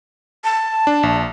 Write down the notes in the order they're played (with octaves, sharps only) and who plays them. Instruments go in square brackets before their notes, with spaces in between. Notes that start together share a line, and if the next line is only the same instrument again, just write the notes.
[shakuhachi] A5
[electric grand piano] D4
A#1